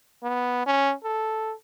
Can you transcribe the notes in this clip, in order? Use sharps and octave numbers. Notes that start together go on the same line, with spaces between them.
B3
C#4
A4